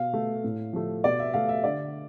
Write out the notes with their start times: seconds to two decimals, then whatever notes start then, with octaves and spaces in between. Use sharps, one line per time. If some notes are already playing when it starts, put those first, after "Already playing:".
Already playing: B2 F5
0.13 A3
0.44 A2
0.73 F3 A3
1.04 B2 D5
1.19 E5
1.34 A3 F5
1.49 E5
1.64 D3 D5